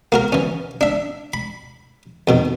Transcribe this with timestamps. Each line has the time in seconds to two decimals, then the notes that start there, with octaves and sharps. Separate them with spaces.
0.12 A#3 F#4 A#4
0.32 E3 C#4
0.81 D4 E5
1.34 B5
2.28 F2 B2 D#3